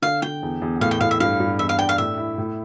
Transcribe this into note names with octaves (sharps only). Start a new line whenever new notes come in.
D3 F5
D3 G5
E2
E2
A2 F5
G5
A2 F5
E5
G2 F5
G2
E2 E5
F5
D4 G5
F5
A2 E5
E4
A2